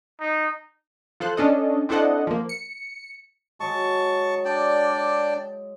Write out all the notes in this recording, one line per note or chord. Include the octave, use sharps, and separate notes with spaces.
D#4
F3 A4 C5 F#6
C#4 D4 A4 D#5
C4 D4 E4 A4 D#5 F#5
F3 A#3
C#7
F#3 G#3 A5 C#6
D4 D5 G5